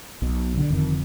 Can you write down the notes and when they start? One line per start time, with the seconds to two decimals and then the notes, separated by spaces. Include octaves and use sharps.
0.22 B1 B2
0.57 D3
0.70 F1 F2 D3 D#3